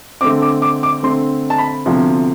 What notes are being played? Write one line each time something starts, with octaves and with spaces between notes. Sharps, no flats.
D3 A3 C4 D6
D6
D6
D6
D3 A3 C4 C6
A5
B5
D2 C3 F3 B3